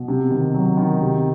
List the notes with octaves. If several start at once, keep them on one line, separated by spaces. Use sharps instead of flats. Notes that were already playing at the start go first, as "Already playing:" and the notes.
Already playing: B2
C3
D#3
F#3
D#3
C3